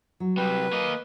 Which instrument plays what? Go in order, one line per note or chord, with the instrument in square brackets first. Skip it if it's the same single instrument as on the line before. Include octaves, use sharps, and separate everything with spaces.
[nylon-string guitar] F#3
[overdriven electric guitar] C2 G3 [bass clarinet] B4
[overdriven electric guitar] A#3 D#5